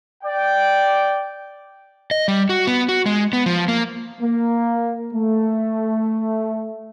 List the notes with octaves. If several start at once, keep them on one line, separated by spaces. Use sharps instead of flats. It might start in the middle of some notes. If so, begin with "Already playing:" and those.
D5 G5
D#5
G3
F#4
B3
F#4
G#3
B3
F3
A#3
A#3
A3